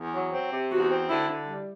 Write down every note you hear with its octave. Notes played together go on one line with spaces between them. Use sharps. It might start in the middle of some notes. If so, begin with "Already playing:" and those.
Already playing: E2
F#3
C4
C3
E2 F#4
C4
D3 E4
D3
G3